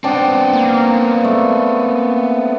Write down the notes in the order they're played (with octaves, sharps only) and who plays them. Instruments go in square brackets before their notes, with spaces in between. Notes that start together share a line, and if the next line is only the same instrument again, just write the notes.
[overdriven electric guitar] B3 C4 [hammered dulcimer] D4 G5 A5
[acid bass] A#3
[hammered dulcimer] A3